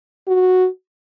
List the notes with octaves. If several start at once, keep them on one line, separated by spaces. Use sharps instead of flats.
F#4